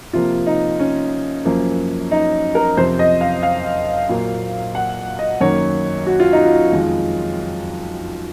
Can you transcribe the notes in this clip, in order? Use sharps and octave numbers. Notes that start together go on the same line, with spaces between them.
C3 F3 A#3 F4
D#4
C#4
F#2 F3 A#3
D#4
A#4
F2 C3 F3 C5
D#5
F5
F5
A#2 F#3 A#3
F#5
D#5
F#2 D#3 A#3 C#5
F#4
F4
D#4
F4
F2 D#3 G#3